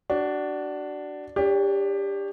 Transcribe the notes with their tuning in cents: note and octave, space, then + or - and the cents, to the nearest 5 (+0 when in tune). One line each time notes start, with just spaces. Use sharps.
D4 +0 F#4 +25
D4 +0 G4 +20 C#5 +30